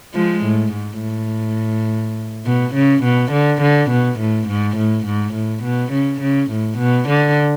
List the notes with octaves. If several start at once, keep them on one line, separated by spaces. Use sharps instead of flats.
F3 G#3
A2
G#2
A2
B2
C#3
B2
D3
D3
B2
A2
G#2
A2
G#2
A2
B2
C#3
C#3
A2
B2
D3